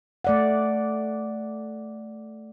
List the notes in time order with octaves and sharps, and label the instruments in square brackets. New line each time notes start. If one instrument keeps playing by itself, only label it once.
[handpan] A3 D5 F#5